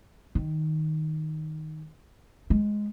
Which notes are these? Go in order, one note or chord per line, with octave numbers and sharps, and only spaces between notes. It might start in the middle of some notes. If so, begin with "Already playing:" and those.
D#3
G#3